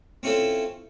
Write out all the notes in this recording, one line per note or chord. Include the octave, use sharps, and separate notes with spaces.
C4 C#4 E4 F4 A4